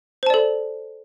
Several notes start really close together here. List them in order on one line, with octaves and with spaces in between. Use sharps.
C5 A5 D5 A4